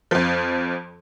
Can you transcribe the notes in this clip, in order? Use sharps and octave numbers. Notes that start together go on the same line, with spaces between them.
F2 F3